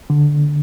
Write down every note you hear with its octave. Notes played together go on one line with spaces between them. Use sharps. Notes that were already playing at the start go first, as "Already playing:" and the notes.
D3